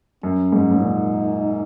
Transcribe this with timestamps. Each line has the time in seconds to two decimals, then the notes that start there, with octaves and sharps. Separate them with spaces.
0.23 F#2 C#4
0.52 G#2
0.71 G#2
0.81 A#2 D#4